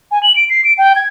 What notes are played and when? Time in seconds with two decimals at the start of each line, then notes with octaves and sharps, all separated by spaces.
0.11 G#5
0.23 F#7
0.36 D7
0.50 C7
0.64 D7
0.78 G5
0.96 G#6